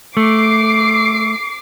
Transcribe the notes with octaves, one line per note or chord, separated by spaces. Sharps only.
A3 D6 C7